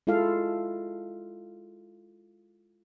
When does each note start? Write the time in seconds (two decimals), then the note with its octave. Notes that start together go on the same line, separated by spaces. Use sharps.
0.07 G#3 E4 F4 A4 F5